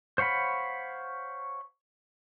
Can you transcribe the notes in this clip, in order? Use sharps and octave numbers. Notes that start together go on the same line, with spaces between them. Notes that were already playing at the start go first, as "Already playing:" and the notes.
C5 C#5 F5 F#5 B5